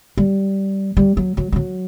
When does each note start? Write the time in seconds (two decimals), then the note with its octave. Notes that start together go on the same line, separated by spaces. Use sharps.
0.17 G3
0.97 G3
1.17 F#3
1.37 F#3
1.52 G3
1.56 F#3